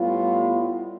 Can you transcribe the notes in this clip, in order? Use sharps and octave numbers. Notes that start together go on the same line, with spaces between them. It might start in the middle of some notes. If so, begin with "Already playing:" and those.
Already playing: A2 G3 B3 F4